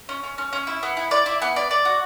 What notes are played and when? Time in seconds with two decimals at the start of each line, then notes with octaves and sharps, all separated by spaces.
0.09 C#4
0.23 C#4
0.38 C#4
0.53 C#4
0.67 E4
0.83 B3
0.97 E4
1.11 D5
1.26 E4
1.42 B3
1.56 D5
1.71 D5
1.85 F#4